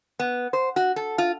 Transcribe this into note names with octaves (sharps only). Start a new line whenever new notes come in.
B3
C5
F#4
A4
F4